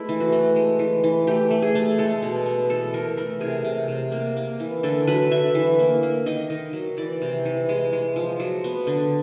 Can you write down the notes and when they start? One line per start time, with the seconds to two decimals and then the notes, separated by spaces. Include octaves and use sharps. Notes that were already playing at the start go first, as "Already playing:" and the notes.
Already playing: G#3 A3 B3 E4
0.09 E3
0.20 F#4
0.32 A3
0.56 G#3
0.79 E3
1.04 E3
1.27 A3 G4
1.51 A3
1.62 G#4
1.75 A3
1.98 G#3 A4
2.22 B2
2.46 B3
2.70 E3 A4
2.93 E3 A#4
3.17 A3 A#4
3.41 C3 G#4
3.65 C3
3.88 C3
4.12 A#3
4.37 A#3
4.60 E3
4.83 D3 A4
5.07 F#3 B4
5.31 D3 E5
5.55 E3
5.79 A#3
6.03 A#3
6.26 D#3 D#5
6.50 D#3
6.73 F#3
6.97 E3 D5
7.22 C3
7.46 E3
7.69 G#3
7.93 G#3
8.16 F3
8.40 F#3
8.64 B3
8.87 D3